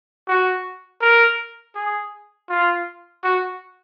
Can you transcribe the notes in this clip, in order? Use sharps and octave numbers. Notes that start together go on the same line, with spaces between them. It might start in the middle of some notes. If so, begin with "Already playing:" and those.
F#4
A#4
G#4
F4
F#4